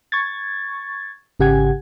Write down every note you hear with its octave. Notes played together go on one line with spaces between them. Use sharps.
C#6 G#6 A6
G#1 C#3 G4 F#5 G#5 G#6